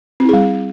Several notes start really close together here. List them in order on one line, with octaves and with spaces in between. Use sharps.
C4 E4 G#4 G3